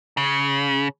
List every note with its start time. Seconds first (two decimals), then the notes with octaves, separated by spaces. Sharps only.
0.17 C#3